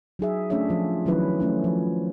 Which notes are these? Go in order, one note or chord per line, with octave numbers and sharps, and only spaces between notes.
F#3 D#4 G#4 E5
A3 C#4 D4 G#4 C#5 E5
F3 F4
D#3 F3 F#3 C#4 E4 B4
A3 C#4 E4
F3